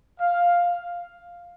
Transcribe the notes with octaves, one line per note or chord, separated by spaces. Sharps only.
F5